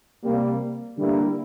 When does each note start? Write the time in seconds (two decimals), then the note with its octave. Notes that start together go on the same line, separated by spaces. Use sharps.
0.24 C3 G3 A#3
0.98 D3 G3 A#3 E4